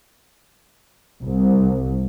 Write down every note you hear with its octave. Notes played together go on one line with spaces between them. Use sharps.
C2